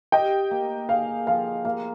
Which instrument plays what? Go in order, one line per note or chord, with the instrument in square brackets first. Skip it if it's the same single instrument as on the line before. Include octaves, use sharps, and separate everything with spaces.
[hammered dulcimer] G4 [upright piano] D#5 G5
[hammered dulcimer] A#3
[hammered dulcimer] G#4 [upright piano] F5
[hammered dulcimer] F3 [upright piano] F5
[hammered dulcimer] A#3 [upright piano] F5